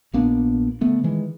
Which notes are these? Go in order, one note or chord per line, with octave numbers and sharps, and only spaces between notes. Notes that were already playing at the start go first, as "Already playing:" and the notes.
A#1 A#3 B3 D4
D3 A3 B3
D#3 E3 G#3